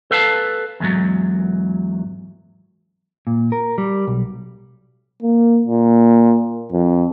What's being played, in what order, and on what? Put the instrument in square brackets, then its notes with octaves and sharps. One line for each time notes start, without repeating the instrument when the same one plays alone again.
[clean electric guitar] A4 B4 F5 F#5 A5
E2 G#2 F#3
A#2
A#4
G3
B1
[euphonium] A#3
A#2
F2